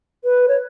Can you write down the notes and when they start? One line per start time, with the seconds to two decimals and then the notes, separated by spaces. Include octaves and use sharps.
0.24 B4
0.48 C#5